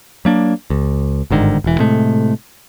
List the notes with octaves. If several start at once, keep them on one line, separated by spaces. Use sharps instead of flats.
F#3 A#3 D4
C#2
G1 G#2 D3 D#3
E1 E3
A2 C3 G#3 A3